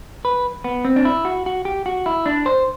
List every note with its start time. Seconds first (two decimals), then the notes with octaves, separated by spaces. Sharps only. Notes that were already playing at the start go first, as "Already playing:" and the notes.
0.25 B4
0.64 B3
0.85 C4
0.96 D4
1.05 E4
1.25 F#4
1.46 F#4
1.65 G4
1.86 F#4
2.06 E4
2.26 D4
2.46 C5